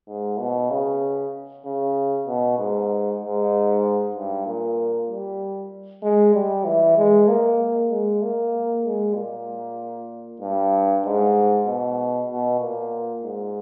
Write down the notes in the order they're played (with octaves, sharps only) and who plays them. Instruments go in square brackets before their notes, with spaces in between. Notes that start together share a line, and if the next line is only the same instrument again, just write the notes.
[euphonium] G#2
B2
C#3
C#3
B2
G#2
G#2
G2
A#2
G3
G#3
G3
E3
G#3
A#3
G#3
A#3
G#3
A#2
G2
G#2
B2
B2
A#2
G#2